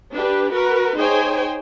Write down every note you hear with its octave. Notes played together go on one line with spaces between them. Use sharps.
D4 G4 B4
F#4 A#4 B4
D#4 G#4 C5 C#5 G5 G#5